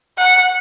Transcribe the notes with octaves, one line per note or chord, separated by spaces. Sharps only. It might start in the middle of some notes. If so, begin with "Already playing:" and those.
F#5